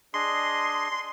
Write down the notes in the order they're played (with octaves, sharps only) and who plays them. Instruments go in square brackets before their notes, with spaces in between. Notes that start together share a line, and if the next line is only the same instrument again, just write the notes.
[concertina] D4 G#4 D#5 [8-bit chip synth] C6